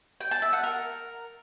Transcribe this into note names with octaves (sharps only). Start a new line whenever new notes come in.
G5
A5
E5
F#5
A#4